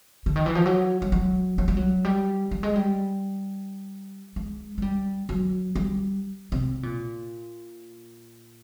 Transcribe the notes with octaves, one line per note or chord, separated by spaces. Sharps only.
D3
D#3
E3
F3
F#3
G3
F#3
F#3
G3
F#3
G3
G3
G#3
G3
G#3
G#3
G3
F#3
G3
C3
A#2